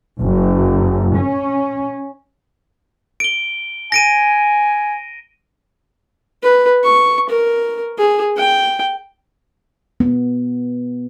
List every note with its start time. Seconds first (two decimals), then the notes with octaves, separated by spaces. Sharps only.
0.23 F#1
1.18 C#4
3.20 D7 G7
3.92 G#5 A#6 D7 D#7
6.42 B4
6.84 C#6
7.29 A#4
7.98 G#4
8.37 G5
10.00 B3